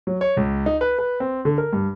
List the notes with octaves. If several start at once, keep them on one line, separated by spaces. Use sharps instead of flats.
F#3
C#5
C#2
D#4
B4
B4
C4
D3
A#4
G2